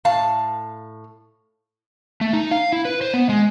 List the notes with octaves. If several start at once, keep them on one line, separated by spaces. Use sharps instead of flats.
A2 F5 A5
A3
D#4
F5
E4
B4
C5
B3
G#3